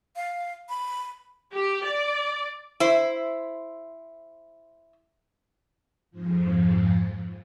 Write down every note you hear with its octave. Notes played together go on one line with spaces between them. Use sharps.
F5
B5
G4
D5
E4 C5
F2 G#2 F3